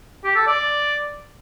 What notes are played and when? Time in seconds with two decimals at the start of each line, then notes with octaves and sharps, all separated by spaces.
0.24 G4
0.35 A4
0.47 D5